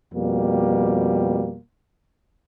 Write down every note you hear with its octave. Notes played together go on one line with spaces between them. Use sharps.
F2 B2 G3 A#3